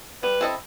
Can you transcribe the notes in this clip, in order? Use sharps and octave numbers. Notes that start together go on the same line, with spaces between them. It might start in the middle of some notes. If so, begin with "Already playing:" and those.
G3 B4
C4 E4 A4 D#5